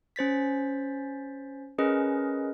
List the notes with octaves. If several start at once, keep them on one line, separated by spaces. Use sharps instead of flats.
C#4 C5 A6 B6
C#4 G#4 A#4 B4 D#5